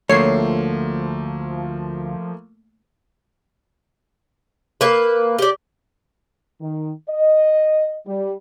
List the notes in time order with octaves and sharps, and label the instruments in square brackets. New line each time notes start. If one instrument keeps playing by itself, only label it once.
[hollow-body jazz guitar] D2 [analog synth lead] F3 [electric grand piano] A3 A#3 [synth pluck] C#5 C7
[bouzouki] A#3 B4
G4 D5
[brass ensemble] D#3
D#5
G3